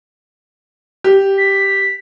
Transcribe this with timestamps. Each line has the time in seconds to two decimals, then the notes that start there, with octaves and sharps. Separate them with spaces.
1.04 G4
1.38 B6